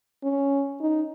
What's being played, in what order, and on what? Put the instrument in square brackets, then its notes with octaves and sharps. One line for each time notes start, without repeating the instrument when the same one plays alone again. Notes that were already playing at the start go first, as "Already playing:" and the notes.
[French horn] C#4
D#4